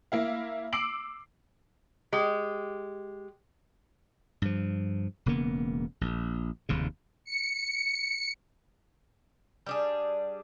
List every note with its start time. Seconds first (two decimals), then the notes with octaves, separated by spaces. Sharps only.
0.12 A#3 E4 F5
0.73 D6 E6 C7 D7 F#7
2.13 G#3 G4
4.42 G2 F3
5.26 E1 C#3 A#3 B3
6.01 A#1
6.69 F1 D#2 C#3
7.25 C#7
9.66 G3 D4 G#4